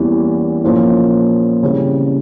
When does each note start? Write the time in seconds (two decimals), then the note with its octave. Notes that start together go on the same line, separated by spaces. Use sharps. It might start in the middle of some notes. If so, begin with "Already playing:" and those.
Already playing: E2 E3 G3 A#3 C#4
0.63 A#2 F3 A#3 C#4 E4
1.63 C#3 E3 G3 C4